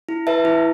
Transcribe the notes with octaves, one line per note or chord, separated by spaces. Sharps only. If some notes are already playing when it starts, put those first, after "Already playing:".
E4
B4 E5 A5
E4